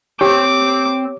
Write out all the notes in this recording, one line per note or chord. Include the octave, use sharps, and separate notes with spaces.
C4 G4 C#5 G5 D6